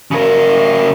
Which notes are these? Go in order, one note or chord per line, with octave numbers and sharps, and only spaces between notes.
C#3 A#4